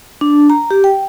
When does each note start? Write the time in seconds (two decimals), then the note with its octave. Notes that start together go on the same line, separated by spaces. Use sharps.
0.21 D4
0.50 A#5
0.71 G4
0.84 G5